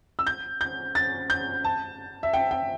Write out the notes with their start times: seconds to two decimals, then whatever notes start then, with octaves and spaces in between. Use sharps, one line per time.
0.19 E6
0.27 G6
0.61 G6
0.95 A6
1.30 G6
1.64 A5
2.23 E5
2.33 G5
2.51 G5